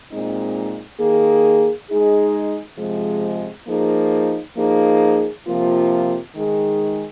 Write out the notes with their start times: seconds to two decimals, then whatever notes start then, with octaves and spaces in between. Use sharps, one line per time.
0.11 A#2 G#3 C4 D#4
0.99 D#3 A#3 G#4
1.90 G#3 D#4 G#4
2.78 C3 F3 G#3
3.67 F3 A#3 D#4 G#4
4.56 F3 A#3 D#4 G#4
5.46 C3 F3 A#3 F4
6.35 D#3 G#3 D#4 G#4